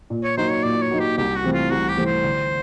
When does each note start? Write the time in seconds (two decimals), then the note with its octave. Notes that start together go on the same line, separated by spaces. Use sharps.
0.10 A#2
0.24 C#5
0.37 F#3 A#3 D#4 C5
0.51 C#5
0.64 A#2 D5
0.82 C#5
0.91 F#3 A#3 D#4
1.00 G4
1.17 C2 G4
1.35 F#4
1.44 C3 E3 A3 C4
1.53 F4
1.70 C2 F#4
1.88 G4
1.97 C3 E3 A3 C4
2.06 C5
2.24 D3